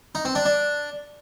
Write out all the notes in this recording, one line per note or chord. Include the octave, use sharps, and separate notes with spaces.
D#4
C4
D4
D4